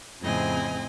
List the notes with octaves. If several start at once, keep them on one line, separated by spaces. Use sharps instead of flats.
F2 A2 C#3 C4 D#5 G#5